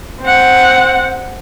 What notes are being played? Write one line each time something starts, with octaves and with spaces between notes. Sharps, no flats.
C4 F#5